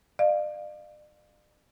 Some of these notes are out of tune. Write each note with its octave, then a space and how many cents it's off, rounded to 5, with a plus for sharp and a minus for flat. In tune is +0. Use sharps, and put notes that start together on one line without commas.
D5 +40 F5 +0